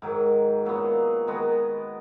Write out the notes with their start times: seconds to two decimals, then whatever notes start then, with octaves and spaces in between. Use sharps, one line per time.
0.02 G#2 D#3 F#3
0.65 A#2 F#3 B3
1.27 D#3 G#3 B3 F#4